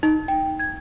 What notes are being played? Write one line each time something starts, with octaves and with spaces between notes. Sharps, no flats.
D#4
G5
G#6